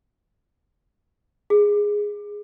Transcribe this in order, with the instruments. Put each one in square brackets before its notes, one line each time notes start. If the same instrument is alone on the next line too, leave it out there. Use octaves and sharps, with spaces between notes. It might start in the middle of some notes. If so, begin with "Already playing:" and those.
[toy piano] G#4